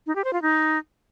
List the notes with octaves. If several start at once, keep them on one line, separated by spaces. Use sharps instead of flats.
D#4
G4
C5
F4
D#4